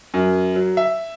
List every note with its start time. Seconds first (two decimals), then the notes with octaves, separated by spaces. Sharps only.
0.14 F#2
0.56 F#3
0.77 E5